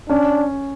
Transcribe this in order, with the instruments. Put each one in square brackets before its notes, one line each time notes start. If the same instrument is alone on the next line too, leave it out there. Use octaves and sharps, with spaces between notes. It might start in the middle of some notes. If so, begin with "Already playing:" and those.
[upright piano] C#4 [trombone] D4